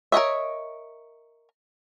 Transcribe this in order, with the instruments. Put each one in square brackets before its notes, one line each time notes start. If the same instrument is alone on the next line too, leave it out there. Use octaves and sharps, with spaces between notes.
[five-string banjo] A#4 C#5 D#5 E5